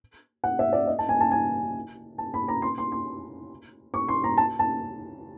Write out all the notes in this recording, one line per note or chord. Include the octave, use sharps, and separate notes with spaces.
F#5
E5
D5
D#5
A5
G#5
A5
G#5
A5
B5
A#5
C6
C6
C6
C#6
C6
A#5
A5
A5